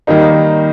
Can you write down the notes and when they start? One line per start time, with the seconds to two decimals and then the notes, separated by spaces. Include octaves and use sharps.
0.07 D#3 G3 A#3 D#4